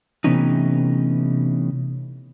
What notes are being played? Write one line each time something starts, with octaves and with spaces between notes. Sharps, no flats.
C3 E3 A3 B3 C#4 D#4